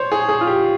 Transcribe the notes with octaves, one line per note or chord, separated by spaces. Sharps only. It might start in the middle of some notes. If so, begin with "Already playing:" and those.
Already playing: C5 C#5
G#4
G#4
F4
G4